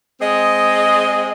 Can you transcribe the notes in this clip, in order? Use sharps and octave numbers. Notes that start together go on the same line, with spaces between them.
G#3 C4 G#4 D#5